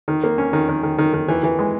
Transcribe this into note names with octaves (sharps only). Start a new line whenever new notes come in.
D#3
A#3
C#4
D#3
D#3
D#3
D#3
D#3
E3
E3
G#3